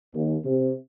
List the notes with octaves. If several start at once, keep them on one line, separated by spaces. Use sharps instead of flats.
D#2
C3